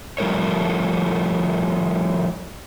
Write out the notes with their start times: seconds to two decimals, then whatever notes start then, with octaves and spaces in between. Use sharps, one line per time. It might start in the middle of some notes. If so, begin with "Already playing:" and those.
0.18 F3 G3 A3 A#4 C#5